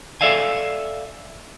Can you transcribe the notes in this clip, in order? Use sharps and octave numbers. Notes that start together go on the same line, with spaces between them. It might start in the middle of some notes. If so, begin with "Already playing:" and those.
A4 D5 E5 F5 G#5